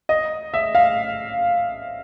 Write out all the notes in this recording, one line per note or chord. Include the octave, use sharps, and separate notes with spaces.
D#5
E5
F5